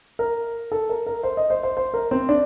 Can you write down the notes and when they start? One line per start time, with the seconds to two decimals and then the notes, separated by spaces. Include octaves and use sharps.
0.19 A#4
0.72 A4
0.89 A#4
1.07 A#4
1.23 C5
1.37 D#5
1.50 C5
1.63 C5
1.77 C5
1.94 A#4
2.11 C4
2.29 D4